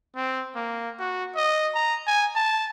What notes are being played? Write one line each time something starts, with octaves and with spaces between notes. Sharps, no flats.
C4
A#3
F#4
D#5
A#5
G#5
A5